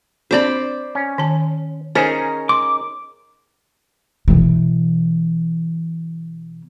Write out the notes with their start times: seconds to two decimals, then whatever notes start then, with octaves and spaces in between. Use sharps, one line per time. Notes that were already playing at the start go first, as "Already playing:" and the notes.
0.31 C4 D4 C5 D5 B5
0.95 C#4
1.18 D#3 A5
1.95 C#4 D#4 G#4 A#4 C5 G#5 A#5
2.49 C6 D6
4.28 B2 E3